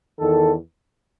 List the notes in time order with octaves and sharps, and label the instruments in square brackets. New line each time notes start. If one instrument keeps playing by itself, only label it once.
[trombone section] E2 D#3 A4